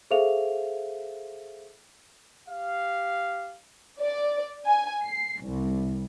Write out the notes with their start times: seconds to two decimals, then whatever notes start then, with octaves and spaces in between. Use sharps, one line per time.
0.11 G#4 A4 C5 E5 F5 F7
2.48 G4 F5
4.01 D5
4.66 G#5
5.03 C7
5.43 C2